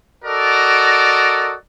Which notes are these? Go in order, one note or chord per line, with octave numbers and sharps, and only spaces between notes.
F#4 A4 A#4 D5 D#5